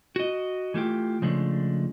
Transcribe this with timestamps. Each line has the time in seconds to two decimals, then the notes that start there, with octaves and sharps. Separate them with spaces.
0.16 F#4 D#5
0.74 E3 A3 F4 G4
1.22 C#3 F3 G#3 A3 D4